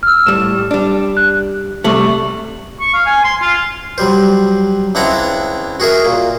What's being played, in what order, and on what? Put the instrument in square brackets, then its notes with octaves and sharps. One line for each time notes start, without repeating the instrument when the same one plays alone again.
[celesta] E6 F6
[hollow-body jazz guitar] A2 G3 [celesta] E7
[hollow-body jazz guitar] G3 D4
[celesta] F#6
[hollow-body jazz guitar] C3 G3 A3 [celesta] C#6 F#7
[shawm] C#6
F5
G#5
C6
F4
[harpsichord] F#3 G3 C5
C#2 C4 D4 E4 F#5 A#5
F#4 G#4 A#4 E5
A#2